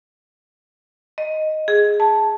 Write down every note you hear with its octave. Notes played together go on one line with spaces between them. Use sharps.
D#5
G#4
A5